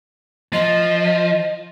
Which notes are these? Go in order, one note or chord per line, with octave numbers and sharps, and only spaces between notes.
F3 D#5